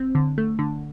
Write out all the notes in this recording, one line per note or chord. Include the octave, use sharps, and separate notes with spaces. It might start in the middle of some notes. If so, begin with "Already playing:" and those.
Already playing: C4
D3
A3
D3